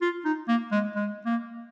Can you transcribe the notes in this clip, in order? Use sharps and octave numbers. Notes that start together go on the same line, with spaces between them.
F4
D#4
A#3
G#3
G#3
A#3